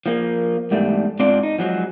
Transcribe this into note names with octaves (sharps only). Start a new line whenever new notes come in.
F3 A#3
E2 G#2 G3 A3
G#2 C4 D4 F4 D5
D#4
F3 F#3 G#3